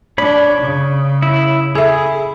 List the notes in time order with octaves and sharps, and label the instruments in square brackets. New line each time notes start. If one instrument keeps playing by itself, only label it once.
[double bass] D4 [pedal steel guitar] C#5 B5
[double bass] C#3
[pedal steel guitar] E4
[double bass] E4 [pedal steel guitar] G#4 [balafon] A4 E5